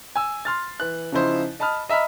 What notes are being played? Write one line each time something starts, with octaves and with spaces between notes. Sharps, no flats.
G#5 E6
C6 F6 A6
E3 F#6
C#3 F3 D#4 E4 C5
D#5 A5 B5 D#6 F6
D#5 E5 A#5 B5 F6